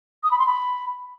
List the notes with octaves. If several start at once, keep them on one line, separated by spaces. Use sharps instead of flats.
D#6
B5
C6
B5